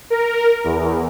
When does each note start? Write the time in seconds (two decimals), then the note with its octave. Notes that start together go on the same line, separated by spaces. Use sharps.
0.10 A#4
0.64 E2